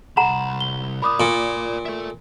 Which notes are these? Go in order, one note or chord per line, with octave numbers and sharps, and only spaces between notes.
C2 F#5 A#5 B5 E7
G7
A#4 D5 B5 D6 D#6
A#2
A4 E5